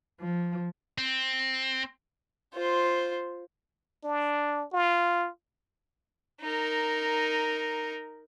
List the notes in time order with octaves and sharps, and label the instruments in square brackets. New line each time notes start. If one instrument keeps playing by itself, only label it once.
[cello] F3
[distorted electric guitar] C4
[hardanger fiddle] F4 C5
[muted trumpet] D4
F4
[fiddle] D#4 A#4